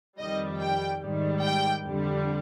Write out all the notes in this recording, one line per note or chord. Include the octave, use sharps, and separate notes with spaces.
F2 D#3 G3 D#5
G5
G#2 D#3 G3
G5
F2 D3 G3